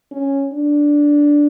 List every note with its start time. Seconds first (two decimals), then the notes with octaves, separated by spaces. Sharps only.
0.11 C#4
0.53 D4